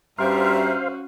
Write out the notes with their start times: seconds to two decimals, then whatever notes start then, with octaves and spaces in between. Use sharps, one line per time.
0.19 G2 G3 C#4 F#4 C5 E5 F5 A#5